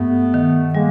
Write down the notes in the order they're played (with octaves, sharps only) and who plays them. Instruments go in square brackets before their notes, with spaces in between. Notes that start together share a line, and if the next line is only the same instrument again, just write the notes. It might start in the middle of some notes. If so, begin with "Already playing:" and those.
Already playing: [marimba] G2 [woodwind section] A3 B3
[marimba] D#3
[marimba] G3 [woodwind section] G#3 A#3